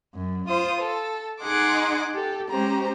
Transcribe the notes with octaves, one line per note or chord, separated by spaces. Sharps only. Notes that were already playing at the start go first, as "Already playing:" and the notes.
F#2
F4 C5 D#6
A4
D#4 G#4 F#5 C6 D6
G4 A4
G#3 C#4 G4 C5 A#5